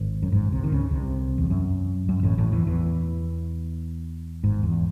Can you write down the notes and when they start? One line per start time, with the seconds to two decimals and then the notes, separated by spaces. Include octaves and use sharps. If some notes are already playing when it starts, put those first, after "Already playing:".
Already playing: G#1
0.23 F#2
0.32 G#1 G#2
0.52 C2 C3
0.64 D#3
0.72 C#2 C#3
0.91 C2 C3
1.38 E2
1.50 F#2
2.09 F#2
2.23 A1 A2
2.38 A1 A2
2.52 E2 E3
2.67 E2 E3
4.43 G#1 G#2
4.63 E2